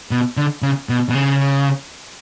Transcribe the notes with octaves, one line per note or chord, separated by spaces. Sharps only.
B2
D3
C#3
B2
B2
C#3